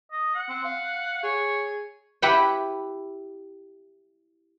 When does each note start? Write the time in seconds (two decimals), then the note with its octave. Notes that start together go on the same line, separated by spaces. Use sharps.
0.12 D#5
0.35 F#5
0.49 C4
0.64 F5
1.23 G#4 C#5
2.22 E4 G4 B4 E5 F#5 G5